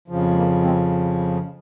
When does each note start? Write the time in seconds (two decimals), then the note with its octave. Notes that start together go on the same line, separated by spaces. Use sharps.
0.08 F2 C#3 F3
0.31 G#3
0.35 A#3
0.62 G#3 C4